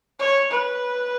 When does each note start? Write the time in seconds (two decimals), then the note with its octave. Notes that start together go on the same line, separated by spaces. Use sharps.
0.20 C#5
0.51 B4